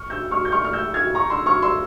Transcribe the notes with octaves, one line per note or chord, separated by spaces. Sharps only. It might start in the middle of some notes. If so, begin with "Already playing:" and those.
Already playing: C#6 F6
E6 G6
C#6 F6
G6
C#6 F6
F6
E6 G6
F6 G#6
A#5 C#6
C6 E6
C#6 F6
C6 E6